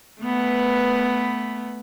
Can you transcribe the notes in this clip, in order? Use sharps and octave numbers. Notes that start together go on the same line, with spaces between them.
A3 B3 B4